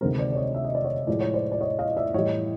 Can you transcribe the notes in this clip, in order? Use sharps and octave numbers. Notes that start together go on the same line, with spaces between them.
D2 C3 D#3 G#3 A#4 C5
C5 D5
D5
C#5 D#5
E5
D#5
D5
C#5 D#5
A2 F3 G#3 D5
C#5
C5 D5
D5
C#5 D#5
D#5 F5
D5 E5
A2 E3 G3 C#5 D#5